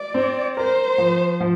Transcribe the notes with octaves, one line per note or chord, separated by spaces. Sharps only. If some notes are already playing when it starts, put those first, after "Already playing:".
Already playing: D5
C4
A#4 C5
F3
F3